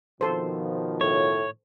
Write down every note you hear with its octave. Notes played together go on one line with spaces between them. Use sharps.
B2 D#3 F3 A4 C5
A2 C#5